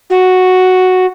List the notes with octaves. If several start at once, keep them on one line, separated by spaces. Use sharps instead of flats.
F#4